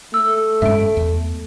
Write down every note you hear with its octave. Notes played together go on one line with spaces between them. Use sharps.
A3 E6
G2 G#3 C#4 E5 D7
E2